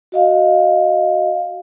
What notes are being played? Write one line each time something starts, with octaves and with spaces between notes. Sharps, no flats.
F#4 D#5 F5